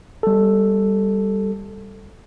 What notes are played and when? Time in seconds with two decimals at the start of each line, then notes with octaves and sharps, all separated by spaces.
0.23 G3 A4